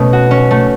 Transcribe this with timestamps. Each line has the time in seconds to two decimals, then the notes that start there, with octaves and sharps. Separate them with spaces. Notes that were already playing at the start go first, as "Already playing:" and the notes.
Already playing: B2 A3 C#4
0.13 F#4
0.31 C#4
0.51 A3